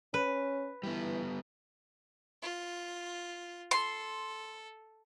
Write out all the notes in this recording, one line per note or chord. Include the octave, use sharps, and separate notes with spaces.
C#4 B4
E3 G3 B3
F4
A4 C6